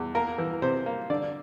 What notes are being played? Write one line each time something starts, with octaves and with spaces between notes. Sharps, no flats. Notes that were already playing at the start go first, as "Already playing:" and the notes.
Already playing: E2
A#3 A#4
E3
C3 C5
A#3
D3 D5